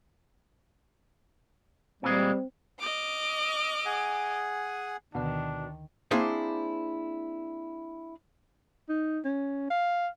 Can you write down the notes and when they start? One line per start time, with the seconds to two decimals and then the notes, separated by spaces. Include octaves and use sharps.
2.03 A#2 E3 G3 G#3 C4
2.80 D#5 D6 F6
3.86 G#4 F#5 G#5
5.15 D2 B2 D3 D#3 D4
6.11 A#3 C4 D4 E4 G#4 C5
8.89 D#4
9.25 C#4
9.70 F5